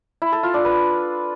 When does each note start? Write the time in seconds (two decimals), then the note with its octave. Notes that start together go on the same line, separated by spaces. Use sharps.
0.22 E4
0.32 A4
0.43 F4
0.54 D4
0.65 B4